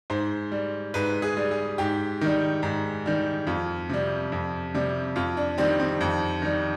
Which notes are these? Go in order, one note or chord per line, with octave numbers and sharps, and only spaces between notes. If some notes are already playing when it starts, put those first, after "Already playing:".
G#2 C5
G3
G#2 B4
G#4
G3
G#4
G#2 G4
D#3 G3
G#2
D#3 G3
F2 F4
C3 G3
F2
C3 G3
F2 F4
D4
D#3 G3 C4
C4
F2
D#3 G3